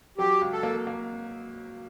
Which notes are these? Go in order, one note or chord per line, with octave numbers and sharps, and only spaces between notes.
F#3 G4
C#2
A4
A#3
A#3